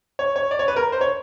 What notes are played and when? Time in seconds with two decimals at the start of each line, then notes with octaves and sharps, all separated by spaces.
0.19 C#5
0.36 C#5
0.51 D5
0.59 C#5
0.68 B4
0.76 A#4
0.92 C5
1.01 C#5